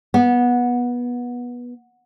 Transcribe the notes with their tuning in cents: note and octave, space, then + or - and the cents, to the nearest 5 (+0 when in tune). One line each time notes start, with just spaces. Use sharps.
B3 -20